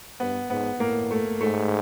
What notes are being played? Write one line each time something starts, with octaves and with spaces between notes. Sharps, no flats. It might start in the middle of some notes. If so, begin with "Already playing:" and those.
G2 B3
G#2 B3
A2 A#3
A3
G#2 A3